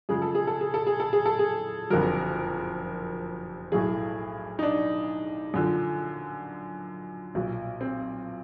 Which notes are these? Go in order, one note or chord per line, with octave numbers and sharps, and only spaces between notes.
F#2 C#3 F3 G#3 G#4
A4
G#4
A4
G#4
A4
G#4
A4
G#4
A4
G#4
F#1 F2 D3 F#3 A#4
B1 A2 F#3 A3 G#4
D#4
D4
F#2 D3 F3
B1 A#2 F#3
C4